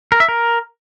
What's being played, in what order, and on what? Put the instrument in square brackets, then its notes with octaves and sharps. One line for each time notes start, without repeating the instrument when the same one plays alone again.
[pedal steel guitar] A#4
E5
A#4